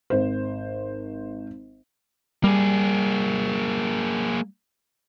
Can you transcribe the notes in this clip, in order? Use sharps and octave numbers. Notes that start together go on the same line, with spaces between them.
G#1 C5
G3 A#3 G#4